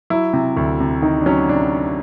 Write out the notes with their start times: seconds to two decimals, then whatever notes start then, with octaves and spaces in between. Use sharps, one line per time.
0.10 F#3 E4
0.33 C3
0.57 D2
0.80 C3
1.02 D#3 D#4
1.21 D4
1.26 F#3 C#4
1.49 C3 D4